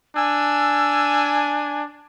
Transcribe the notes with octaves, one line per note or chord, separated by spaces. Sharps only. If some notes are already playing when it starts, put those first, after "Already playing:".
D4 G#5 E6